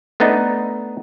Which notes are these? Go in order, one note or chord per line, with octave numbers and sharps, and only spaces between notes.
A3 B3 D4 D#4